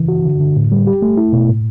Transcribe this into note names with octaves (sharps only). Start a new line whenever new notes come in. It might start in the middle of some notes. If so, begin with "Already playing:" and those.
Already playing: C#3 E3
F#4
D3
D3
A2
G3
G4
A3
E4
B2
A2